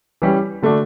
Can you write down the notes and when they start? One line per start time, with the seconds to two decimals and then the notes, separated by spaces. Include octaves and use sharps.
0.22 E3 G3 C#4 G4
0.63 D3 A3 D4 F#4